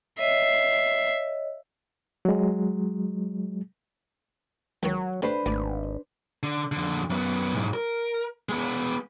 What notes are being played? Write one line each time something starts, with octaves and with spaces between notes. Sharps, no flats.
C#5 D#5 E5 C7
F#3 G#3
C#2 D#3 F#3 C#5
C3 A3 D4 B4 C5
G#1 D2 D5
D3
F2 D3
F#2 B3
B1 G#2
A#4
G#3 B3